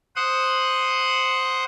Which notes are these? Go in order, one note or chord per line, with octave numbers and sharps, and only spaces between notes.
C5 F#5 D#6